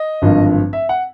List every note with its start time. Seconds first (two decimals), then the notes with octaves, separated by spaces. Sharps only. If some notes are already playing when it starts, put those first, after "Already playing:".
Already playing: D#5
0.22 G#1 G2 D3 F3
0.73 E5
0.89 F#5